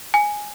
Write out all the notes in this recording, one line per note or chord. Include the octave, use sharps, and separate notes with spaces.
G#5